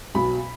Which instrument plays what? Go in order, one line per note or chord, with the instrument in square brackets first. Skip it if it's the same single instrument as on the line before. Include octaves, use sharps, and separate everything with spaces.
[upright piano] B1 B2 F#3 B5